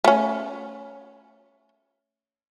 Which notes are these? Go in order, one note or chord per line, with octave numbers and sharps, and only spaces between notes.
A3 C#4